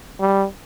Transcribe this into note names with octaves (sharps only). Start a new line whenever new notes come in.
G3